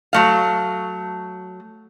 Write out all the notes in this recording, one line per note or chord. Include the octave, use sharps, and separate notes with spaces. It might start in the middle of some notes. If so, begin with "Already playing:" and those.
F#3 A3 F5